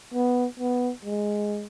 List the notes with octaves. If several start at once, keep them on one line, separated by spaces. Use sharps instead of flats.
B3
B3
G#3